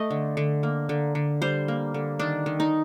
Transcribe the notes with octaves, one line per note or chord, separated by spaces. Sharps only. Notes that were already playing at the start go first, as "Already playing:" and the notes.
Already playing: A3 D#5
D3
D3
A#3
D3
D3
G3 C5
A#3
D3
D#3 D4
D#3
D#4